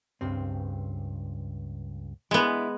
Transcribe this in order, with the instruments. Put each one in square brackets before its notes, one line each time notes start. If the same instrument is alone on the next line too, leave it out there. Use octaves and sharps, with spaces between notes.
[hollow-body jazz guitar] C#2 G2 C4
[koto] G#3 B3 [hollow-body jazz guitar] D4 E4